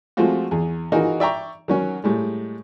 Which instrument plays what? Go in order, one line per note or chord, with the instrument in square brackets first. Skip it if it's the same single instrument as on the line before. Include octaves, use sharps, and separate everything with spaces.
[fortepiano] F3 G#3 A3 C4 F4 F#4
E2 G#4
E3 D#4 F4 F#4 G#4 A#4
D5 E5 G5 A#5 C#6
D#3 F#3 C#4
A2 G3 G#3